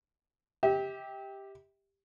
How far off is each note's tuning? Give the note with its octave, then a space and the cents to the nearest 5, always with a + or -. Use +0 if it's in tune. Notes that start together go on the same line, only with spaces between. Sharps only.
G4 +5 E5 -40